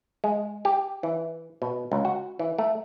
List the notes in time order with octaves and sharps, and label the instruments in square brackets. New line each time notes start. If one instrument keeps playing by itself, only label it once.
[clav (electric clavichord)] G#3
G4
E3
B2
C#2
F#4
E3
A3